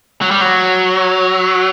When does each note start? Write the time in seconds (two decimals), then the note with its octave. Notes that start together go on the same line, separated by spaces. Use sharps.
0.22 F#3
0.31 G3
0.41 F#3